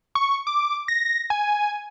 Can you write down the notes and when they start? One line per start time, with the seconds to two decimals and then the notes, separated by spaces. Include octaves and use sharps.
0.15 C#6
0.47 D6
0.88 A#6
1.30 G#5